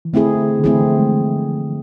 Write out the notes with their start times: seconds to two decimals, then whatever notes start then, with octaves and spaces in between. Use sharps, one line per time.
0.05 E3
0.13 D3 A3 C4 E4 G#4
0.59 D3
0.64 E3 A3 C4 E4 G#4
0.80 F3
0.98 G#3